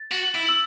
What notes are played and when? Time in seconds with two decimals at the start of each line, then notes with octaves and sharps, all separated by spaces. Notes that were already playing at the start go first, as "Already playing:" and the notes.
Already playing: A6
0.11 F#4
0.35 E4
0.49 E6